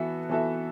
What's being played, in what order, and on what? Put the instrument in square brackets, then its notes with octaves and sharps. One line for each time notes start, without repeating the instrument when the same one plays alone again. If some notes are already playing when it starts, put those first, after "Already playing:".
Already playing: [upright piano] E3 B3 F#4 A4 [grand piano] E5
[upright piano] E3 B3 F#4 A4 E5